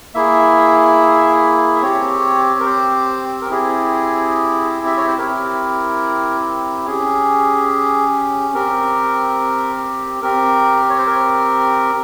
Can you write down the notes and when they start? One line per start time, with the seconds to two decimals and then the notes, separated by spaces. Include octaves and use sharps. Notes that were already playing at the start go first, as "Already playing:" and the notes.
0.14 A#3 E4 G#4 E5
1.76 E5
1.82 C4 G4 C#5
2.60 A#4
2.66 C5
3.41 A#4
3.50 C4 E4 G4 G#4
4.86 E5
4.97 C#5
5.07 C5
5.18 C4 E4 G4 A#4
6.86 C#4 G4 G#4
8.54 C4 G4 A#4
10.22 C4 G4 A#4
10.89 C#5
10.99 C5
11.07 A#4